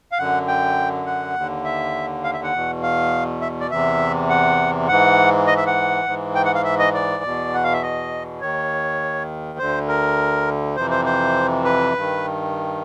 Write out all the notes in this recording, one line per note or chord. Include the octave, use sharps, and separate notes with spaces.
F5
F#2 D3 F#5
G5
F#5
D#2 D3
E5
F5
E5
F#5
E2 B2
F5
E5
D5
E2 C3 E3 E5
F#5
G#2 E3 F#5
D#5
E5
F#5
G#2 E3
G5
F#5
F5
E5
D#5
D5
E2 B2
F#5
F5
E5
D#5
D#2 D#3 C#5
D2 D3 C5
A#4
F2 C3 E3 C5
C5
C5
B4
G2 D#3